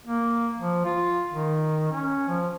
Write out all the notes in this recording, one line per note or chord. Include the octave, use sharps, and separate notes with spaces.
A#3
F3
F4
D#3
C#4
F3